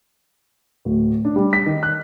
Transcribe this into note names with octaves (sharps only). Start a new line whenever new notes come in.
D1
D4
G3
B6
D#3
F#6